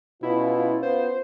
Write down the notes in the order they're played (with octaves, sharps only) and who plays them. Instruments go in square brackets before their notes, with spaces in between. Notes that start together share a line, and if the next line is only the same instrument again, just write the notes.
[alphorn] B2 [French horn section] C#4 F4 [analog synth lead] E4
[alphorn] B3 [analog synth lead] C5